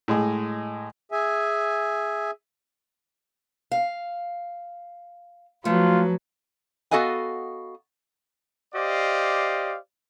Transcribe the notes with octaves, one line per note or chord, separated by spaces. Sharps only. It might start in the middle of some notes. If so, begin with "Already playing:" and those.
A2 G#3 G#4
G#4 E5 G#5
F5
F3 F#3 A3 F4 B4
B3 F#4 A4 D#5 F5 G#5
G4 C5 D5 D#5 F5